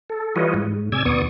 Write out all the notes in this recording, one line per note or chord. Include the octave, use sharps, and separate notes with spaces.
A4
E3 G3 F4 B4 C#5 D#5
G#2
C3 D5 G#5 E6 G#6
D#2 B2 B3 D5 C#6 D#6